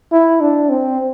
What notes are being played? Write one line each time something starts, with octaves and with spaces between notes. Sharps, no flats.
E4
D4
C4